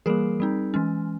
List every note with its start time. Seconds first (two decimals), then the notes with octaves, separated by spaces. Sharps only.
0.06 E3 G3 A#3 G#4 A#4
0.40 G3 C4 D#4
0.74 E3 G#3 C#4